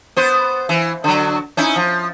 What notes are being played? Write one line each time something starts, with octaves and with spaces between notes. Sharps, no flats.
B3 C5
E3
D3 F#3
C#4 D#4 E4
F3